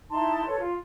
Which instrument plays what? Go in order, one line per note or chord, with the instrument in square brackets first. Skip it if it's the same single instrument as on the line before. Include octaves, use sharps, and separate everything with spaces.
[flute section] D#4 E4 A5 C6
A4 B4 C#5
F4